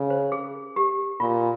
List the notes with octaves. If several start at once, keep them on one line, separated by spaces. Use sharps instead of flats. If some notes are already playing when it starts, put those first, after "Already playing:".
Already playing: C#3
C5
G#4
G4
A#2 F4